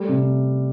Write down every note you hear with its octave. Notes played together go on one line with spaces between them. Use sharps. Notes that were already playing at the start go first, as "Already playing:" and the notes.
Already playing: G3 A3
C3